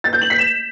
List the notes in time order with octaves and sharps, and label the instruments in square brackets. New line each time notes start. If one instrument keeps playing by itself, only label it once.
[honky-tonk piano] A6
G6
F#7
B6
E7